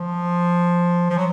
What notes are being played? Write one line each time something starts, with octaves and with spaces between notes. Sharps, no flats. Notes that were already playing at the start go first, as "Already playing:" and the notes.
Already playing: F3
F3
F#3